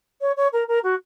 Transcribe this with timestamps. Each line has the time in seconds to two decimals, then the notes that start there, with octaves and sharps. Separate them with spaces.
0.21 C#5
0.37 C#5
0.53 A#4
0.68 A#4
0.84 F#4